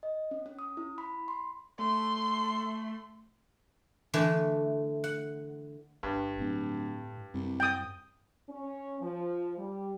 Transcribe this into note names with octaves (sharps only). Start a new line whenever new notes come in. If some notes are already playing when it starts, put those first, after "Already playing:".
D#5
C#4
C#4
D#6
E4
B5
C6
A3 C6
D3 E3 A3
F#5
G1 G2
D1 A2
C2 F#2
G5 D#6
C#4
F3
G3